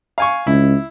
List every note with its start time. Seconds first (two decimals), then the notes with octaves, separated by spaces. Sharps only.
0.18 F5 G#5 C#6
0.47 C#2 E4